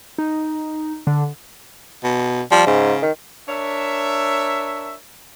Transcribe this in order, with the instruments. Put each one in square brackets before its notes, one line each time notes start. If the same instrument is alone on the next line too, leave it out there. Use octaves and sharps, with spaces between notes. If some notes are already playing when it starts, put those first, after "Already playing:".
[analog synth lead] D#4
D3
[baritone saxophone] B2
[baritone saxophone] F3 [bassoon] G3
[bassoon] G#2 [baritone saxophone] C#3
[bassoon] D#3
[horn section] D4 A#4 C#5 E5